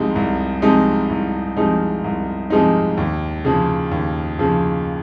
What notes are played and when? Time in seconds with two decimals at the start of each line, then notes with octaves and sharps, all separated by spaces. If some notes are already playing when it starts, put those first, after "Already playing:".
Already playing: C2 C3 F3 G#3 D#4
0.15 C2
0.62 C3 F3 G#3 D#4
1.10 C2
1.57 C3 F3 G#3 D#4
2.04 C2
2.50 C3 F3 G#3 D#4
2.97 D#2
3.45 C#3 F3
3.91 D#2
4.39 C#3 F3